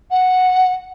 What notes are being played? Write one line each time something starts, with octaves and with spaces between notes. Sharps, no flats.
F#5